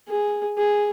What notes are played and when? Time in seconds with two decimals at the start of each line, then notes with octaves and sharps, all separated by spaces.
0.08 G#4
0.58 G#4